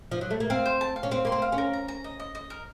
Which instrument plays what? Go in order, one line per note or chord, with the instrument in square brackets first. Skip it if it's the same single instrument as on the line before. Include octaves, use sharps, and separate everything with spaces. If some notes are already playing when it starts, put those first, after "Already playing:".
[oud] F3
F#3
A3
A#3
[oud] C4 [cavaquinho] F5
[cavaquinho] C5
A5
F5
[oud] C#4
[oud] C4 [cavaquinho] F5
[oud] A#3 [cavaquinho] C6
[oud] C4
[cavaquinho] F5
[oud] C#4
[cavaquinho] A#4
A#5
A#5
D#5
D#5
D#5
A#4